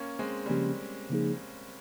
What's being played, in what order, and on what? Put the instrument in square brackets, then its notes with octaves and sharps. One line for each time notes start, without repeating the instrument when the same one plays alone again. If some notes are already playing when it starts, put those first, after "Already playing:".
Already playing: [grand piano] A#3 C#4
G#3 C4
G3
[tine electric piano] C#3 F3 A#3 C#4 G4 [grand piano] G#3
[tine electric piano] C#3 F3 A#3 D#4 G#4